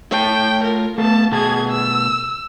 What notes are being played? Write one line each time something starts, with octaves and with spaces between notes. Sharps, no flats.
A3 C#5 G5 A5
F4 A#4
A3 B3 A4 F5 A5
B2 A3 G#4 A5 G#6
E6